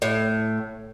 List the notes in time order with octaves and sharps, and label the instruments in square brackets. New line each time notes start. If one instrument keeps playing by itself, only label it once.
[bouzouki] A2